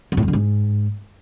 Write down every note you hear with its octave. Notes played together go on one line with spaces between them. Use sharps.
F#2
A2
F2
D3
G#2